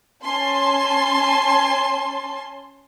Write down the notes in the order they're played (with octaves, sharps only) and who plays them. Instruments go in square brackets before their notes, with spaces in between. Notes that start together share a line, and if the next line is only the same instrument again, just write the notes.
[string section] C#4 G#5 A5 C6